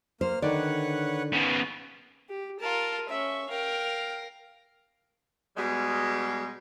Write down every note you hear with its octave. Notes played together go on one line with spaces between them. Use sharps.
A#3 C5 F6
D3 D#3 B4 C#5 D5 F#5
C#3 B3
G4
F4 A#4 A5
C#4 E5 C#6
A#4 F5 G5
B2 G3 G#3